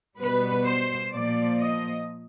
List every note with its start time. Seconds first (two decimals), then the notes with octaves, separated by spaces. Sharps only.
0.18 B2 G3 B3 B4
0.65 C5
1.12 A#2 F3 A#3 D5
1.59 D#5